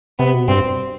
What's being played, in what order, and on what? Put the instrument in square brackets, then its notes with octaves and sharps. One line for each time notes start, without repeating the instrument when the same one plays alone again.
[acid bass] C3 [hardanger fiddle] B3
[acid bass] B2
[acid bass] G2 [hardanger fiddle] C4